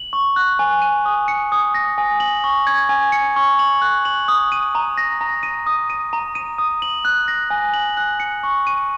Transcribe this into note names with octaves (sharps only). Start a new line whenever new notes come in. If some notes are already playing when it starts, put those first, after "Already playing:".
Already playing: F#7
C#6
F#6
G#5
D#7
D#6
C#7
D#6
A#6
G#5
F#7
C#6
G#6
G#5
C#7
C#6
F#7
F#6
F#7
D#6
D#7
A#5
A#6
A#5
D#7
D#6
D#7
A#5
D#7
D#6
F#7
F#6
A#6
G#5
F#7
F#6
C#7
C#6
D#7